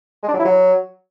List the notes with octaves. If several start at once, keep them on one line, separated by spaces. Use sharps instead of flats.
G#3
D4
F#3
E4
F#3